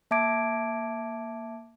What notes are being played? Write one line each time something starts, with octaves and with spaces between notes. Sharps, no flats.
A#3 E5 A5 D6 G#6 D7